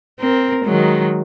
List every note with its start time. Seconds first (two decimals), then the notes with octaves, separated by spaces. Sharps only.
0.20 C4 A#4
0.64 D#3 F#3 G#3